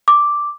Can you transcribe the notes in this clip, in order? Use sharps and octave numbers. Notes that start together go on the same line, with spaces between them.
D6